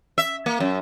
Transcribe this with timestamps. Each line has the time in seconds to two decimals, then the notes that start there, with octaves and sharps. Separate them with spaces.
0.18 E5
0.46 A#3
0.60 F#2